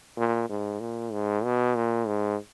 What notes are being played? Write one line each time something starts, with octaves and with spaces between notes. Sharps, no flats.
A#2
G#2
A#2
G#2
B2
A#2
G#2